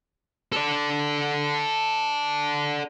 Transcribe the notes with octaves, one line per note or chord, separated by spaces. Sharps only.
A4 D5